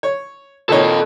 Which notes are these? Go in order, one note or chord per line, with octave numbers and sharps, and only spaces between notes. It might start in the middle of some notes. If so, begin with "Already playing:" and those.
C#5
A#2 D#3 A4 C#5 D#5